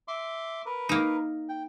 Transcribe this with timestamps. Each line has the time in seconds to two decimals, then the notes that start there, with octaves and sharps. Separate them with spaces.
0.08 E5 C6 D6
0.66 A#4 B4
0.89 A#3 D#4
1.49 G5